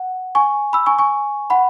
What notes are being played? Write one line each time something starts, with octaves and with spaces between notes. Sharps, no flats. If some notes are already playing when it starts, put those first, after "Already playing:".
Already playing: F#5
G#5 C#6
B5 E6
G#5 C#6
G#5 C#6
F#5 B5